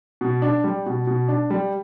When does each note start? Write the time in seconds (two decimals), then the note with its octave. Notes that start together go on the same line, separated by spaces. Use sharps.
0.21 B2
0.42 D4
0.64 G3
0.86 B2
1.07 B2
1.28 D4
1.50 G3